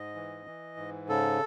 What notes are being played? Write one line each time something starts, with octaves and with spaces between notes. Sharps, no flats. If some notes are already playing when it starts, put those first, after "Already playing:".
Already playing: G#2 D#5
E3
E3
G#2
C#3 A4